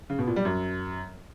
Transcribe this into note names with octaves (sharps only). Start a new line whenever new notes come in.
C#3
B2
A#2
G3
F#2